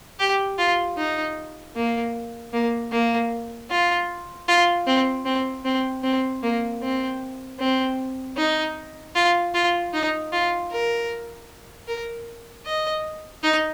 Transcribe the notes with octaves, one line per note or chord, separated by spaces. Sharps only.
G4
F4
D#4
A#3
A#3
A#3
F4
F4
C4
C4
C4
C4
A#3
C4
C4
D#4
F4
F4
D#4
F4
A#4
A#4
D#5
D#4